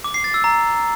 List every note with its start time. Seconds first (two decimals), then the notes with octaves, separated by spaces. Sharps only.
0.04 D6
0.14 C7
0.24 A6
0.34 E6
0.44 A#5